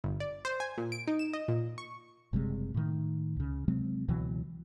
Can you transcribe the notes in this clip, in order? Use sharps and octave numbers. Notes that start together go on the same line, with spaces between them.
G1
D5
C5
G#5
A#2
D7
D#4
E7
D#5
A#2
C#6
F#1 C3 G3 G#3
A2 D#3
C#2 C#3
C3 F#3 G#3 C4
C#2 B2 E3 F#3